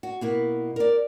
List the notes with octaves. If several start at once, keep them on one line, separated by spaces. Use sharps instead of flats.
F#4
B2 A#3 E4
A#4 D5